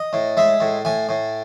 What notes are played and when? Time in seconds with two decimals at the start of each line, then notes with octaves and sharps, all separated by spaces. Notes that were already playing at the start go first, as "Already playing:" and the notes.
Already playing: D#5
0.13 A2
0.37 G#3 E5
0.60 A2
0.85 A2 G#5
1.09 A2